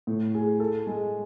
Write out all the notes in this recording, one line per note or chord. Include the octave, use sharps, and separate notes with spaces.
A2
G#4
A4
G#3